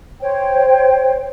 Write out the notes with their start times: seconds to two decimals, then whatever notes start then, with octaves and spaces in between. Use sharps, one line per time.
0.21 C5 C#5 G5